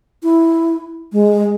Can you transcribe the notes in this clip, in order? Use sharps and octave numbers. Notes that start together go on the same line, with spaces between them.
E4
G#3